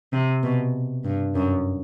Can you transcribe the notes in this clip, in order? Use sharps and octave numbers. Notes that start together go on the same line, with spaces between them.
C3
B2
G2
F#2